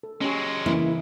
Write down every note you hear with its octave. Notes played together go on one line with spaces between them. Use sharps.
A4
F#3 G#3 C#4 G4
C#3 E3 A#3 E4